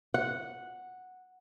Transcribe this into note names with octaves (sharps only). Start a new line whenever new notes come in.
F#5